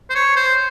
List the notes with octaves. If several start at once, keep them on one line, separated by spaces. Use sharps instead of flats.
C5
C#5
C5